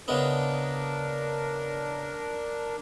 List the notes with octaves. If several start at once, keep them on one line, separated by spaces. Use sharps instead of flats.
C#3 G#3 B3 D4 A#4